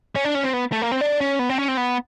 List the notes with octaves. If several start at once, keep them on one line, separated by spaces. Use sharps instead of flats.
C#4
D4
C#4
C4
B3
A3
A#3
C4
D4
C#4
B3
C4
C#4
C4
B3